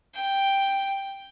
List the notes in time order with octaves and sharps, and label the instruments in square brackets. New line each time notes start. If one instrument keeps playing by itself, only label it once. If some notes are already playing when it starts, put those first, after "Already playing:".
[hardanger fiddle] G5